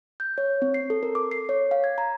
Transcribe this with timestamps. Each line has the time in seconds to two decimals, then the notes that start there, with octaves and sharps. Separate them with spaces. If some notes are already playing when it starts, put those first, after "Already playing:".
0.20 G6
0.38 C#5
0.62 C4
0.74 C7
0.90 A4
1.03 A#4
1.15 D6
1.31 C7
1.49 C#5
1.71 F5
1.84 G#6
1.98 A#5